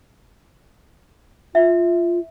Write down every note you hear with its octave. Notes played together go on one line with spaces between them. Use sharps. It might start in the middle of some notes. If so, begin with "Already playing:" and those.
F4 E5